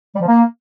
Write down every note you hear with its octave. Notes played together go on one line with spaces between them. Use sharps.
G3
F3
A#3